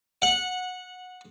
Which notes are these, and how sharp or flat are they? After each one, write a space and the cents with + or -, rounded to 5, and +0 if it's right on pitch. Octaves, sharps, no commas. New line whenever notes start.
F#5 -15